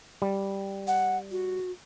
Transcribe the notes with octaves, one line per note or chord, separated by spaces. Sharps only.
G3
F#5
F#4